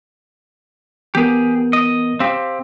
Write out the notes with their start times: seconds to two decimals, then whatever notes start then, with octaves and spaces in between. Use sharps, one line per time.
1.15 E3 B3 G4 G#4 A#4
1.73 D#5
2.20 C4 G4 F5